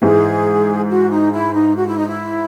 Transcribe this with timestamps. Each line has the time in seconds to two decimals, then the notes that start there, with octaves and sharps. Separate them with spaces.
0.02 G#2 E3 G#3 G#4
0.89 F#4
1.10 D#4
1.33 E4
1.53 D#4
1.76 F#4
1.87 E4
1.97 D#4
2.08 E4